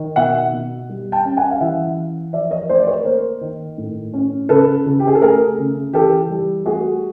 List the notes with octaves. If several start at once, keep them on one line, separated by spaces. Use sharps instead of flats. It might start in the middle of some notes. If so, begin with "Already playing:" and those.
Already playing: D#3
B2 E5 F#5
B2
G3
G5 A5
C#4
F#5 G#5
F5
E3 E5 F#5
E3
F3 D5 E5
C#5 D#5
A3 C5 D5
D5
B4 C#5
A#3 A#4 C5
D#3
A2
C#4
C#3 A4 B4
C#3
G4
G#4
A4
A3 G#4 A#4
C#3
E3 G4 A4
G3
A3 F#4 G#4